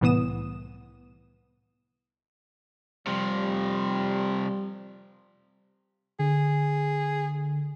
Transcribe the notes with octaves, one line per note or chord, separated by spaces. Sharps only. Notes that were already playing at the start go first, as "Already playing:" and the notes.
C2 A2 E3 B3 D#6 E7
C3 F3 G3
D3 G#4